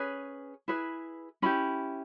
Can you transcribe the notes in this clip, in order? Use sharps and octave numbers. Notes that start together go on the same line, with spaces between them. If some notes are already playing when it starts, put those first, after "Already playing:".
Already playing: C#4 G#4 B4
E4 G#4 B4
C#4 E4 G4 B5